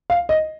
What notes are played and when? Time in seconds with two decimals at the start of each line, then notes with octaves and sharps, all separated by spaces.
0.10 F5
0.29 D#5